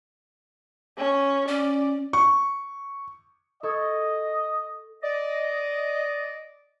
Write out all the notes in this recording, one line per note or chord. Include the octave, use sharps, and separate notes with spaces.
C#4
C#4 D5
C#6
A4 D#5 C#6 G#6
D5 D#5